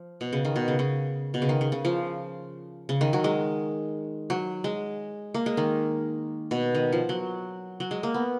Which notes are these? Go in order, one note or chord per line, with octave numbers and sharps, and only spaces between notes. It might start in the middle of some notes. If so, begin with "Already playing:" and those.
Already playing: F3
B2
C#3
D#3
B2
C#3
C#3
B2
C#3
D#3
C#3
C#3
F3
C#3
D#3
F#3
G#3
F#3
G#3
A#3
G#3
D#3
B2
D#3
F3
F#3
F#3
G#3
A#3
B3